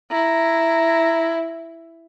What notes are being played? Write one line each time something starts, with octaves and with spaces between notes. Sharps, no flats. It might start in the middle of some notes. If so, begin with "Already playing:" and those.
E4 A#5